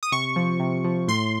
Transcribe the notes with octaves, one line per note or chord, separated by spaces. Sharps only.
D#6
C3 C#6
F3
C3
F3
A2 C6